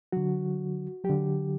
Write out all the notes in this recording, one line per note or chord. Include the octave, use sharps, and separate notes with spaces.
D3 F#3 F#4
D3 F#3 G4